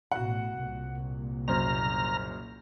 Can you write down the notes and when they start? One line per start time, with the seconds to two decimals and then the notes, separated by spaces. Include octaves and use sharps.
0.12 A1 B2 F#4 F#5
0.63 C2 A#2
1.48 F#1 F#2 C5 A#5 F6